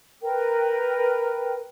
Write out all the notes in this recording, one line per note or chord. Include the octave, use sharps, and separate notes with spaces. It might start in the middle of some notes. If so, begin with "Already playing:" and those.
A#4 B4 G5